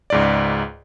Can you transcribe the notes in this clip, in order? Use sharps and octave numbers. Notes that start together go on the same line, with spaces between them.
C#2 G#2 D5